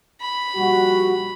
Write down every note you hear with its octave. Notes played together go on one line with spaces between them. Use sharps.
B5
A#1 G3 F#4